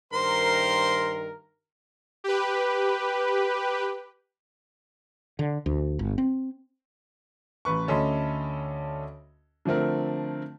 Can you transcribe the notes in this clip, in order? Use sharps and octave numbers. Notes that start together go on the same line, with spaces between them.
G2 D#3 A#4 C5 C6
G4 B4
D3
D2
G1
C4
A1 B4 C#6
D2 C#4 A4 D#5 B5 C6
D3 F3 A3 C4 A#4